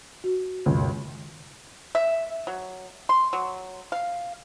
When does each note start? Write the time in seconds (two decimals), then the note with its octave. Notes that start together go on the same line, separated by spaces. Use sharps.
0.24 F#4
0.66 C#2 F#2 B2 D#3
1.95 E5
2.47 F#3
3.09 C6
3.33 F#3
3.92 F5